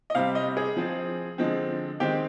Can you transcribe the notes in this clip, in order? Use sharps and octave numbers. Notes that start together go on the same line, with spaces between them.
D#5
C3 G3 C4 F5
D#5
G#4
F3 C4
D3 F3 G#3 C4
D#3 G#3 C4 G4